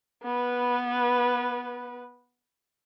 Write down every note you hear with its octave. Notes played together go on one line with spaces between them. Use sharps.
B3 B4